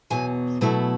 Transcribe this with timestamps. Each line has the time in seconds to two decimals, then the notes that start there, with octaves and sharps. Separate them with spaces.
0.10 E2 B2 F#3 G#5
0.61 B2 F#3 A3 E4